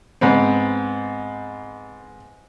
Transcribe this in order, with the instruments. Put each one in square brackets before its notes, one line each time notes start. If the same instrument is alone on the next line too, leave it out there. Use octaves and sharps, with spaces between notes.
[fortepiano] G#2 B3 C4